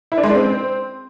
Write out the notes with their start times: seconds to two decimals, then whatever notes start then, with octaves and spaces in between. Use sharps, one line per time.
0.12 E4
0.18 D4
0.23 G#3
0.29 D4
0.35 C4